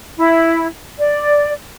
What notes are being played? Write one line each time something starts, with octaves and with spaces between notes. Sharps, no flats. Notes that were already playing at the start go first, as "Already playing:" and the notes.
E4
D5